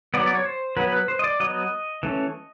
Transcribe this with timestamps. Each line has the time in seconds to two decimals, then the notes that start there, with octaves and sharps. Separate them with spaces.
0.14 B3 D5
0.18 F#3
0.26 D5
0.35 C#5
0.45 C5
0.77 F#3 B3 B4
0.92 B4
1.08 C5
1.19 D#5
1.24 D5
1.40 F#3 B3 D#5
2.03 E3 A3 C#4